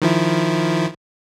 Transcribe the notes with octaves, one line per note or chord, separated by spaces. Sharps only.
D#3 F3 E4